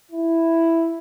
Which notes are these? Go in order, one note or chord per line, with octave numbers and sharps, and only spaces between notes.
E4